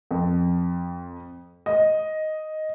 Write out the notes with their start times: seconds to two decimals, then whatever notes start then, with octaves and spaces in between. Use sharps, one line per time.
0.11 F2
1.66 D#5